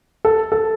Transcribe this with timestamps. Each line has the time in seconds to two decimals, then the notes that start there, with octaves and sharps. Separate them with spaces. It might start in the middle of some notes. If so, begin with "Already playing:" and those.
0.25 A4
0.52 A4